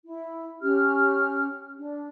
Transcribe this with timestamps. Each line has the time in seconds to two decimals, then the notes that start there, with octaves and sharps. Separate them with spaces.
0.07 E4
0.62 C#4 G4 F6
1.78 D4